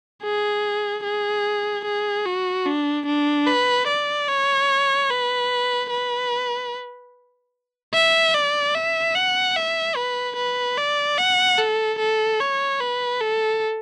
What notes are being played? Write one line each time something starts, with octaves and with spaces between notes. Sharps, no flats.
G#4
G#4
G#4
F#4
D4
D4
B4
D5
C#5
B4
B4
E5
D5
E5
F#5
E5
B4
B4
D5
F#5
A4
A4
C#5
B4
A4